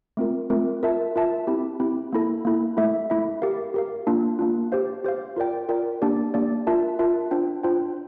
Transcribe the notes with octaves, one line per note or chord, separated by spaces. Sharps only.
A3 C4 F4 A#4
A3 C4 F4 A#4
F4 A#4 E5 A5
F4 A#4 E5 A5
C4 E4 G4
C4 E4 G4
A#3 E4 A4
A#3 E4 A4
A3 E4 A4 E5
A3 E4 A4 E5
G4 A#4 F5
G4 A#4 F5
A#3 D4 F4
A#3 D4 F4
G4 C5 F5
G4 C5 F5
F4 A#4 D5 G5
F4 A#4 D5 G5
A#3 D4 G4 D5
A#3 D4 G4 D5
F4 A#4 E5 A5
F4 A#4 E5 A5
D4 F4 C5 G5
D4 F4 C5 G5